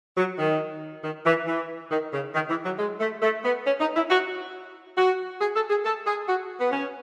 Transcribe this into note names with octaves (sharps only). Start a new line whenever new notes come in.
F#3
D#3
D#3
E3
E3
D#3
C#3
D#3
E3
F#3
G#3
A3
A3
B3
C#4
D#4
E4
F#4
F#4
G#4
A4
G#4
A4
G#4
F#4
B3
C#4